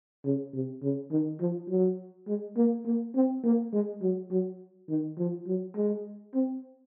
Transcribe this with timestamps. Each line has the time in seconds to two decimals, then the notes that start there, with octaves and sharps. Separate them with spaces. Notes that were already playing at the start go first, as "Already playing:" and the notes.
0.25 C#3
0.53 C3
0.83 C#3
1.11 D#3
1.40 F3
1.69 F#3
2.27 G#3
2.57 A#3
2.85 A#3
3.15 C4
3.43 A#3
3.73 G#3
4.02 F#3
4.31 F#3
4.88 D#3
5.18 F3
5.47 F#3
5.76 G#3
6.34 C4